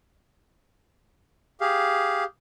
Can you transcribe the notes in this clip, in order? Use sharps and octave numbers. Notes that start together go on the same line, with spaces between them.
G4 G#4 F5